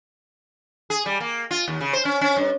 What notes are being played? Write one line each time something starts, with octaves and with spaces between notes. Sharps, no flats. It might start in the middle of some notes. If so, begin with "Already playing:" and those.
G#4
G3
A#3
F4
D#2
C#3
C5
C#4
C#4
G2